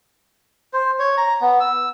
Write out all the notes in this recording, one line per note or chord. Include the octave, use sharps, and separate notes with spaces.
C5
C#5
A#5
B3
E6